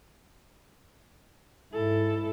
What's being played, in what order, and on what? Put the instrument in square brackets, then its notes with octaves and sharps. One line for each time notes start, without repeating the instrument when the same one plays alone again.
[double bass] G#2 E4 [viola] A4